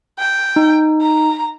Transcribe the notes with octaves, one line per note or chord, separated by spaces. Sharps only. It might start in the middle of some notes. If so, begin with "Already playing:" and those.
G5
D#4
A#5